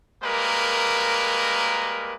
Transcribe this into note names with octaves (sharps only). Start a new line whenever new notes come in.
G3 G#3 A#3 A#4 B4